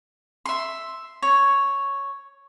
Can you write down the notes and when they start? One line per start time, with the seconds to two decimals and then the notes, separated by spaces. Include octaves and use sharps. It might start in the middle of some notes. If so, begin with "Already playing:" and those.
0.46 E5 C6
1.23 C#5